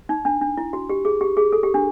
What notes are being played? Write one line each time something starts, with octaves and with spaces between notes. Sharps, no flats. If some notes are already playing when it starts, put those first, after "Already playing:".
D#4
D4
D4
E4
F#4
G4
G#4
G4
G#4
A4
G4
D4